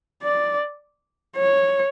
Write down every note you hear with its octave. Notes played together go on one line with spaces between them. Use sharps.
D5
C#5